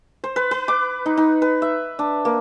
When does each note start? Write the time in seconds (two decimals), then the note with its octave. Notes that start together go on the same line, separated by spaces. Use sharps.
0.24 C5
0.36 B4
0.51 B4
0.68 D6
1.06 D#4
1.17 D#4
1.42 B4
1.62 E5
1.99 D4
2.25 A#3